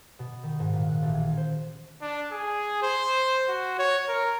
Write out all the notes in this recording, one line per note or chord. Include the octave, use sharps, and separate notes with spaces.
B2
D#3
G#2
A#2
F#6
A1
G#6
C5
D4
G#4
C5
F#4
C#5
A#4